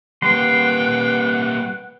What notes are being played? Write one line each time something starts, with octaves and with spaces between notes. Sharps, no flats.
G3 A#3 B4 F#5 G5 C6